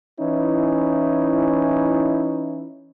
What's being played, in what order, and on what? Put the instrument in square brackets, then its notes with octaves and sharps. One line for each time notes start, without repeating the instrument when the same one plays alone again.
[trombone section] E3 C#4 D#4 E4